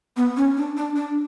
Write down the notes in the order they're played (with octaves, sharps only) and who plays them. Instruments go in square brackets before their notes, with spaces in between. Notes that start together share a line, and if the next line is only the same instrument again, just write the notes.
[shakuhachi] B3
C#4
D4
D4
D4